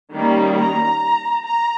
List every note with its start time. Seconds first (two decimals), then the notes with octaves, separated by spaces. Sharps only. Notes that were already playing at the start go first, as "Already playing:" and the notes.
0.14 D#3 G3 A#3 C#4
0.57 A#5
1.44 A#5